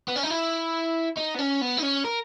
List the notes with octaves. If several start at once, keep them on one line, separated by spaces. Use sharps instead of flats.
B3
C#4
D#4
E4
D#4
B3
C#4
B3
D#4
C#4
A#4